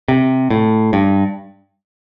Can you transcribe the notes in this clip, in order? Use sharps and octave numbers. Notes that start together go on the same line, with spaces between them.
C3
A2
G2